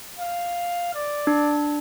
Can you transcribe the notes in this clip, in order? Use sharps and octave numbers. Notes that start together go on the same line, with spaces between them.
F5
D5
D4